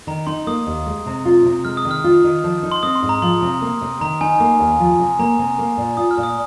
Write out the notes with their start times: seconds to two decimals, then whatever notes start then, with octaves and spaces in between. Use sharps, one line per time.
0.07 D#3 A#5
0.27 D#4 C6
0.47 A#3 D#6
0.66 D#2
0.86 G#3
1.06 C3
1.25 F4
1.45 C3
1.65 G#3 F6
1.77 D#6
1.85 D#3
1.91 F6
2.04 F4
2.24 D#3
2.44 F3
2.63 D#4
2.71 C6
2.83 C4 D#6
2.95 C6
3.02 G#2
3.09 A#5
3.22 F3 C6
3.42 C3
3.61 A#3
3.81 C3
4.00 D#3 A#5
4.21 D#4 G#5
4.40 A#3
4.59 D#2
4.80 F3
4.99 C3
5.19 A#3 A#5
5.39 C3
5.58 A#3
5.78 A#2
5.97 F4 D#6
6.11 F6
6.17 A#2
6.23 D#6